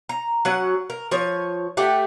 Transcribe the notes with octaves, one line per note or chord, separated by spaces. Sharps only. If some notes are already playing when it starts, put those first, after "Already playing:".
A#5
F#3 C#4 F#5
A#4
F3 C#5
A3 G4 F#5